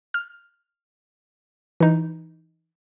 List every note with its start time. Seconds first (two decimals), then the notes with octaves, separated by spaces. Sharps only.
0.14 F6
1.80 E3 D#4